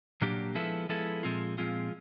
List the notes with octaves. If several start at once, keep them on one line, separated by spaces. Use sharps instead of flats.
A#2 F#3 A#3 D4 G4
F3 G#3 B3 E4 A4
F3 G#3 B3 E4 A4
A#2 F3 G#3 C4 F4
A#2 F3 G#3 C4 F4